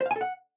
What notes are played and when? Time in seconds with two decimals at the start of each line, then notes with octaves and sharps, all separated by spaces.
0.01 C5
0.06 F5
0.11 G#5
0.16 A4
0.21 F#5